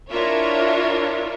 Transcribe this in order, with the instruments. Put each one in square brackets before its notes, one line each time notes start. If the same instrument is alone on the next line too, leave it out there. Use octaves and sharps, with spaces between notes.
[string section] D4 E4 F4 A#4 C#5 E5